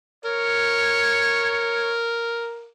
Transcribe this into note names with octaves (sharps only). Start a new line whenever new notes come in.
A#4 C#5